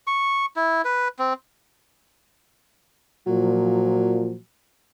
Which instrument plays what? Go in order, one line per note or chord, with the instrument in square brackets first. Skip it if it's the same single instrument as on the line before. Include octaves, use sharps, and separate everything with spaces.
[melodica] C#6
E4
B4
C4
[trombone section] A#2 F3 [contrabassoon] F#3